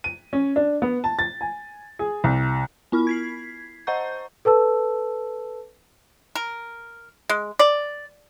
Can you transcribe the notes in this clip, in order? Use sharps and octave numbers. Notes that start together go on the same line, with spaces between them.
D#7
C#4
D4
B3
A5
A6
G#5
G#4
C2
B3 E4 B5 F6
G#6 B6 C7
C5 D#5 F#5 A#5 C#6 G6
A4 B4 A5 E6
A#4
G#3
D5